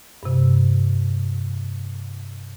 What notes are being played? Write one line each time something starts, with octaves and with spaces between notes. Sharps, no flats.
G2 C3